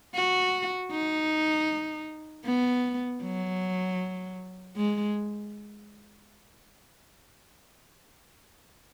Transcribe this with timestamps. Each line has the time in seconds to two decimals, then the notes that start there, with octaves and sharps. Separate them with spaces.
0.15 F#4
0.91 D#4
2.45 B3
3.23 F#3
4.76 G#3